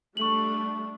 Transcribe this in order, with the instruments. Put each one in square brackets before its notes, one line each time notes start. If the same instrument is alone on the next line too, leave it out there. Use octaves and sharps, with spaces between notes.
[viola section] G3 A3 D4 [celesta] C#6 F#7